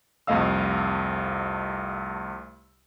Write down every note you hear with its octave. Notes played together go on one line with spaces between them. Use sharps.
C2 F2 A3 D#5 F5 E6